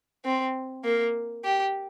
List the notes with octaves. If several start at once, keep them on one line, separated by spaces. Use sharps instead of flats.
C4
A#3
G4